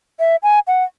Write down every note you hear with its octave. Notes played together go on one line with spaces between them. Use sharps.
E5
G#5
F#5